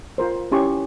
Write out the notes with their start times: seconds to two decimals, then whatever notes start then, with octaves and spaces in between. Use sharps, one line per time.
0.18 F4 A#4 C5
0.52 C#4 E4 G4 G#5 C6 C#6